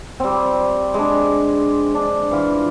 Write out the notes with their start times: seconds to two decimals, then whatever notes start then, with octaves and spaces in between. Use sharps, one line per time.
0.20 G3 C4
0.94 G#3 D4
1.95 D4
2.31 E3 F4